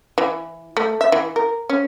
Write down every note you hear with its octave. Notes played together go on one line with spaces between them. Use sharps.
E3
A3
E5
E3
A#4
C#4